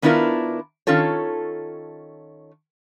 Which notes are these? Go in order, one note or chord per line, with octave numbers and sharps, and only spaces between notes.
D#3 B3 D4 E4 F4 A#4
D#3 C#4 F4 A4 C#5